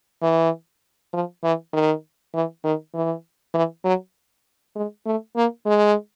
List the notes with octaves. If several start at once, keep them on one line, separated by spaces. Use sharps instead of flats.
E3
F3
E3
D#3
E3
D#3
E3
E3
F#3
G#3
A3
A#3
G#3